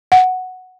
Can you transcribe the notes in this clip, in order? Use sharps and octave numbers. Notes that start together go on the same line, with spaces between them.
F#5